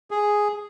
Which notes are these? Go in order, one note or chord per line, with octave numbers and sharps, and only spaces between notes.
G#4